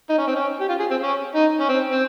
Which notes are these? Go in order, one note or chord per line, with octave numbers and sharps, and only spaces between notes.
D#4
C#4
C4
C#4
G4
F4
G#4
C4
C#4
D#4
C#4
C4
C4